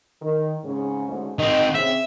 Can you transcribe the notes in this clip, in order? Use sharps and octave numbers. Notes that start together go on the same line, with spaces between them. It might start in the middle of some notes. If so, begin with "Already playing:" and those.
D#3
G#2 C#3 C#4
D2 G#2 C#4
D#3 C4 D#5
C#3 C4 E5